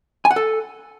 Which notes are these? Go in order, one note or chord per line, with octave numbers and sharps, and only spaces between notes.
G#5
F#5
A4